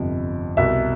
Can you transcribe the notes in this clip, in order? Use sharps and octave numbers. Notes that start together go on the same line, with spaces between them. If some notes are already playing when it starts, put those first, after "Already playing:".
Already playing: G1 F2 C3
C2 B2 E5